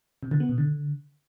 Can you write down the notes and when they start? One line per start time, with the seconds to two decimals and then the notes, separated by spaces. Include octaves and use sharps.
0.23 C3
0.31 D3
0.40 B3
0.49 B2
0.58 D3